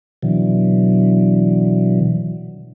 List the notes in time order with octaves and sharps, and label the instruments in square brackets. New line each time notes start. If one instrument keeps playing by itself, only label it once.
[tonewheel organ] B2 D3 E3 F#3